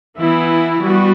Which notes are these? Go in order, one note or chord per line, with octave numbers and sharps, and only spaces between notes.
E3 B3 E4
G3 B3 F#4